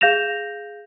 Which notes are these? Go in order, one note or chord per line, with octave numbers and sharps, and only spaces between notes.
G#4 F5 G6 A#6 E7 F7